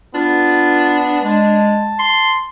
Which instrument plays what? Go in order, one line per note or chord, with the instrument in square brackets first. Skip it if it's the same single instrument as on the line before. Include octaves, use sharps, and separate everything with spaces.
[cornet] B3 [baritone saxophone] D4 [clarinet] F4
[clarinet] G#3 [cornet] A5
[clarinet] C6